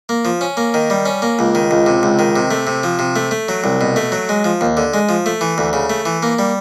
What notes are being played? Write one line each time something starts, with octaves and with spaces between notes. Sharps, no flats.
A#3
F3
C#4
A#3
D#3
G3
C#4
A#3
C#2
D#3
C#2
C3
C#2
D#3
C3
A3
C3
F3
C3
A3
A3
F#3
C2
B2
A3
F#3
G#3
F3
D#2
D3
G#3
F3
A3
E3
D2
C#3
A3
E3
A#3
G3